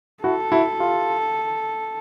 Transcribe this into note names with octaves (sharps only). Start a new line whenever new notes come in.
E4 F#4 A4
E4 F#4
F4 G4